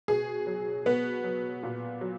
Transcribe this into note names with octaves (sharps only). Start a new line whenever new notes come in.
B2 G#4
F#3
B2 B3
F#3
A#2
F#3